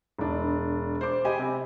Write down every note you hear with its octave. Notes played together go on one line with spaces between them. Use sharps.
E1 D4
C5 D6
G4 D#5 G#5 B5
C3